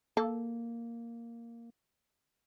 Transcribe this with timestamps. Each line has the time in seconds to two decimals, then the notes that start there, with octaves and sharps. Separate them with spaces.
0.17 A#3 A4